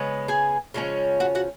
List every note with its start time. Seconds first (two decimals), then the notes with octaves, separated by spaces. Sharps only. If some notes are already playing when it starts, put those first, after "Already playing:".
Already playing: C#3 G#3 B3
0.28 G#4 G#5
0.74 C#3 F3 G#3 C#4
1.20 F#4 F#5
1.35 F#4 F#5